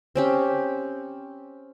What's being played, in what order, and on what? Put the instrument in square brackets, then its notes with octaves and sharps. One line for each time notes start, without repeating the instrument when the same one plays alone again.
[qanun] C4 C#4 G4